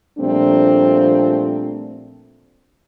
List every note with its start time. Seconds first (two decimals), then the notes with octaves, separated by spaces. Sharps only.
0.19 A#2 F3 G3 A3 C4 D4